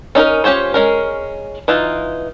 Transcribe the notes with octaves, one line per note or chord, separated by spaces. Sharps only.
C#4 D#4 E4 A#4
C#4 F4 G4 C5 C#5
G#3 C#4 A#4
E3 D#4 F4